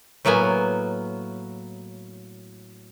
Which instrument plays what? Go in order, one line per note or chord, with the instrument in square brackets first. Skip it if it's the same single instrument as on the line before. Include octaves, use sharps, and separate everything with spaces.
[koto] A2 F#3 A#3 B3 G#5